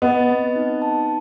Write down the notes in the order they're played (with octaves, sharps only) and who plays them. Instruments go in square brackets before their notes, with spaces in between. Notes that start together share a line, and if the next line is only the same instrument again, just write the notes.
[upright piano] B3 [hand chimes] D#5
[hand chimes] C4
D#4
A5